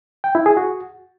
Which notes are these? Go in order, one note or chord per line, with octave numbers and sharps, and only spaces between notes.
G5
E4
G#4
F#4